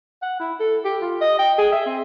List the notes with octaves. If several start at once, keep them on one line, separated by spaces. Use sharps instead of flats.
F#5
E4
A4
G4
F4
D#5
G5
G#4
E5
C4